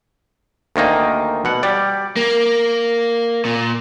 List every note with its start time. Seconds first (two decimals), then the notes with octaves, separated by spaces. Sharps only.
0.76 D2 D#3 A#3 D#4
1.45 B2 F#5
1.63 G3 D5
2.16 A#3
3.45 A#2